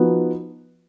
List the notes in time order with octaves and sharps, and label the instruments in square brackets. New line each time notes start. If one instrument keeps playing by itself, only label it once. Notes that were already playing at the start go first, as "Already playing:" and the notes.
Already playing: [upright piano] F3 B3 D#4 F#4